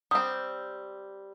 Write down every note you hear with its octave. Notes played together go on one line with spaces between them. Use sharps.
G3 C4 D#6